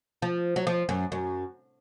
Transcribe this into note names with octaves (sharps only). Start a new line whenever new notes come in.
F3
F#3
F3
F#2
F#2